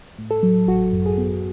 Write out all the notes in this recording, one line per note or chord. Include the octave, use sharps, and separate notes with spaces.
A2
A4
F#3
G#1 F#4
F#2
G#4
B3